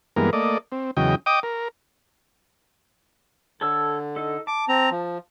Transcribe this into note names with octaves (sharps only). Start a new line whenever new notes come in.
G2 E3 G#3 A#3 B3 A#4
A3 A#3 D5 D#5
C4
E2 C#3 F#3 D#5 G5
D#5 G5 D6 D#6
A#4
D3 A4 C#5 E6
D#4 A4
A5 D6
C4 A#5
F3